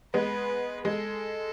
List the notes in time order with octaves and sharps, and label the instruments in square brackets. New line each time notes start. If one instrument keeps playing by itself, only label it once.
[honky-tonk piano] G#3 B3 [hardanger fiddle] B4
[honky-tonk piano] G#3 [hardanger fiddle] A4